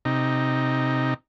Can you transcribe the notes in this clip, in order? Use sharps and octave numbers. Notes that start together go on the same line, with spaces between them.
C3 D#4